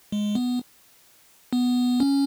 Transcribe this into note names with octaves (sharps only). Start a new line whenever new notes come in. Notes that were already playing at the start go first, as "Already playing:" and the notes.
G#3
B3
B3
C#4